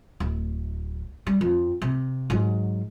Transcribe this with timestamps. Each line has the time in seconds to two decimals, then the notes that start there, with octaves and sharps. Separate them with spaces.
0.20 D1
1.27 G3
1.41 F2
1.82 C3
2.30 G#2 F#3